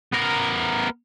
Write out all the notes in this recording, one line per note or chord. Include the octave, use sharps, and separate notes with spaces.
B3 A#4